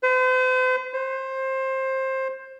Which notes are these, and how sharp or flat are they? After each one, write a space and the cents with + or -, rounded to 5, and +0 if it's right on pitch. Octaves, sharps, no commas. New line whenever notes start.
C5 -40
C5 +20